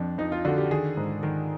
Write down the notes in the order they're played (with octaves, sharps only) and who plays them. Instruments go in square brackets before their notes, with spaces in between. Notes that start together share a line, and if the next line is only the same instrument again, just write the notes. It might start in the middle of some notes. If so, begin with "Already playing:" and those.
Already playing: [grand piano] F2 F3 D4
F2 D#4
F4
D3 F#4
G4
D#3 G#4
G#2
D#3